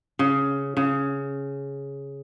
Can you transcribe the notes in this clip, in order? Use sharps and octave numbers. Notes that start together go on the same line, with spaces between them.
C#3
C#3